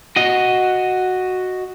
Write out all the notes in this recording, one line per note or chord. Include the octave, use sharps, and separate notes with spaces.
F#4 D#5